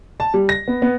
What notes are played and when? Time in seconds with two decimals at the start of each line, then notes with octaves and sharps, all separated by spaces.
0.20 A5
0.34 G3
0.49 A#6
0.68 B3
0.82 B3